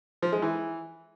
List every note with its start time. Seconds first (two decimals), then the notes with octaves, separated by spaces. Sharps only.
0.22 F3
0.32 G#3
0.42 E3